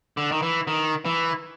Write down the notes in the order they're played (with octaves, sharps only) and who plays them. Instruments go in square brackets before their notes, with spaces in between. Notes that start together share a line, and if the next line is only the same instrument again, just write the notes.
[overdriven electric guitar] D3
D#3
E3
D#3
E3